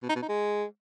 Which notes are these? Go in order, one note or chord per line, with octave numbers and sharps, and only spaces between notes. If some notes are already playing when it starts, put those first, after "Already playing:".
B2
D#4
B2
D#4
G#3